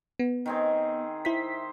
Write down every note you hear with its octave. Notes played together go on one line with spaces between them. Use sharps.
B3
D#3 C4 G#4
E4 C5 B6